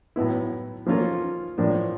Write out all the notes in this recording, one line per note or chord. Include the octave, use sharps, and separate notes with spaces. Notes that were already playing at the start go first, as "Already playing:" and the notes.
A2 F#3 B3 E4
F3 A#3 C#4 F4 A4
A2 F3 A#3 D4